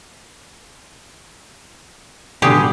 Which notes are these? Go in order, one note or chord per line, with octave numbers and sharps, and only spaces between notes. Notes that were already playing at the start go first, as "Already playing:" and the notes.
B2 D3 G3 G4 G#4